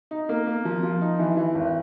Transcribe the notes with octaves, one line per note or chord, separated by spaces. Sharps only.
D#4
A#3
A#3
F3
F3
D#4
E3
E3
G#1